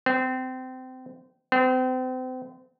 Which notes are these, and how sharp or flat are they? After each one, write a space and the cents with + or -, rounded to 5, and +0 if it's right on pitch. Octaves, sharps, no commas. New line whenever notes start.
C4 -25
C4 -35